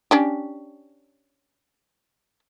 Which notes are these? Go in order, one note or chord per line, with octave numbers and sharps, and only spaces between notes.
C#4 D4 G4